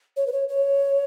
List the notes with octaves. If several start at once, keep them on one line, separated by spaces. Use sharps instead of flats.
C#5
B4
C#5
C#5